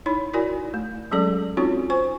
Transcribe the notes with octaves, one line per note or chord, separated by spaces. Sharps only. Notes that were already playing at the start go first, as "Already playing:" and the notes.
D#4 E4 C#5 B5
E4 F#4 A#4 D5 G#5
A3
F#3 G#3 C#4 G#4 A4 D5
C4 C#4 D#4 F4 F#4 C#5
C5 G#5 C#6